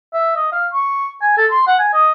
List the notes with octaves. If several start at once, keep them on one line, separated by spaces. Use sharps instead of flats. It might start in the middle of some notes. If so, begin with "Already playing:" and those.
E5
D#5
F5
C#6
G#5
A4
C6
F#5
G#5
D#5